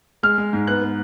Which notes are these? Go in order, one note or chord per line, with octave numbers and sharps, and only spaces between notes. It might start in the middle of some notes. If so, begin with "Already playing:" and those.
G#3 F6
G#3
G#2
B3 F#6
B3